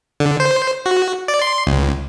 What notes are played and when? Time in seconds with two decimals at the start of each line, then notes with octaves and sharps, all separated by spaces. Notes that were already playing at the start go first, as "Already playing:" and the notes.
0.20 D3
0.40 C5
0.86 F#4
1.28 D5
1.42 C6
1.67 C#2